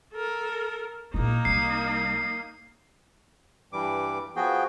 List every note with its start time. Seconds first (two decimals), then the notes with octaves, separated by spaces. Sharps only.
0.13 A4 A#4
1.14 A#1 A#3 D#4 E4
1.45 C2 G3 C7
3.73 G2 E3 G3 D6
4.36 F3 B3 F#4 G#4 G5